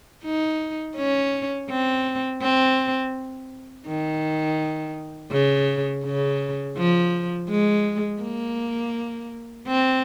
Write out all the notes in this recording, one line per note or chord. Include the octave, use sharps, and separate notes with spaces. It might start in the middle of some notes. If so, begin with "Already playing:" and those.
D#4
C#4
C4
C4
D#3
C#3
C#3
F3
G#3
A#3
C4